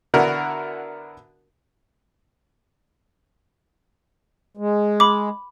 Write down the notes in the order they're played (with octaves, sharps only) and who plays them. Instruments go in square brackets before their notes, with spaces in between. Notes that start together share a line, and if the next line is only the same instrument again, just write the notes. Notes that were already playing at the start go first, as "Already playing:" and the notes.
[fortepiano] D3 B3 D4 E4 F#4 A#4
[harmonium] G#3
[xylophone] B5 D6